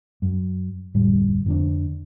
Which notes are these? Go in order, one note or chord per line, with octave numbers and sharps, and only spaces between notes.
F#2
F1 D2 A2 G3
F2 D3 D4